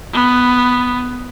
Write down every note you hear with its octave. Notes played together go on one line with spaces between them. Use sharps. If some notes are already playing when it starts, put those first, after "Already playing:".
B3